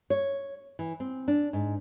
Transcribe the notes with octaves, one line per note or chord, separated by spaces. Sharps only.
C#5
E3
C4
D4
G#2